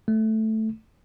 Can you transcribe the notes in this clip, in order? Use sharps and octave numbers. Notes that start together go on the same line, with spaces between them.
A3